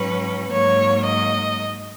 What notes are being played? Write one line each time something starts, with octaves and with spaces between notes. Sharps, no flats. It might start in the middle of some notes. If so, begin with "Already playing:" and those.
Already playing: G#2 F#3 C#4 B4
G#2 F#3 A#3 C#5
D#5